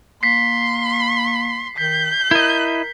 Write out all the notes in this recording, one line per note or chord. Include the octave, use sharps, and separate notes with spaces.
A#3 C6 B6 C7
D#3 G6 B6
E4 A#4 D#5